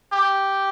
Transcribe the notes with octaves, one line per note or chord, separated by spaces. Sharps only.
G4